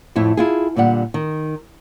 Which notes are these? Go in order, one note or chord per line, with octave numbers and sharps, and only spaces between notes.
F2 A2 A3 E4
E4 F4 G#4
A#2 D3 G3 F#5
D#3